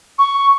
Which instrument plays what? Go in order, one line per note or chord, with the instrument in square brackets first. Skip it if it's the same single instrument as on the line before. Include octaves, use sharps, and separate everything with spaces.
[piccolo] C#6